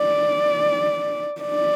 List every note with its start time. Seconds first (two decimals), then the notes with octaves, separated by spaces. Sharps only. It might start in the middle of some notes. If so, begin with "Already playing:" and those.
Already playing: D5
1.41 D5